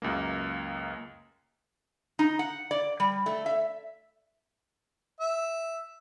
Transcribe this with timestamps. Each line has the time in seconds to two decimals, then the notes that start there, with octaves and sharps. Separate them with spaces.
0.02 C#2 F#2 A#3
2.19 D#4
2.39 F#5
2.71 D5
3.00 G3
3.26 A3
3.46 E5
5.21 E5